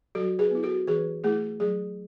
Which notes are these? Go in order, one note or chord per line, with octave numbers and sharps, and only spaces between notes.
F#3 F#4 A4
G#4 B4
B3 E4
F#4 A4
E3 G#4 B4
A3 E4 G#4
F#3 G#4